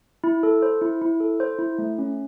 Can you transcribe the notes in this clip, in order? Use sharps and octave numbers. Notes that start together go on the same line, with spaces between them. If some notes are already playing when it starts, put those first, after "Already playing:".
E4
A4
C5
E4
E4
A4
C5
E4
A3
C#4